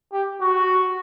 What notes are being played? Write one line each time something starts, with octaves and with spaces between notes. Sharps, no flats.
G4
F#4